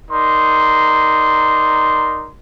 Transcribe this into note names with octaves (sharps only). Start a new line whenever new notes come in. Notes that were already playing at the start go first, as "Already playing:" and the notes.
D#4 A#4 D5 C6